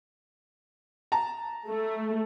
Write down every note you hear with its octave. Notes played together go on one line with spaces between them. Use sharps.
A5 A#5
A3